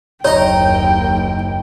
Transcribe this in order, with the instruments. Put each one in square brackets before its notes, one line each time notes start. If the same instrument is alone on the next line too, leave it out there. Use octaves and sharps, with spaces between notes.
[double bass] F#1 D#2 [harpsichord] D#4 A#5 [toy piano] C#5 [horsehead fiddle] G5